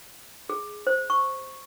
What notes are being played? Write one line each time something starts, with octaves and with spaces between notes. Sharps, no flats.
G#4
C5
C#6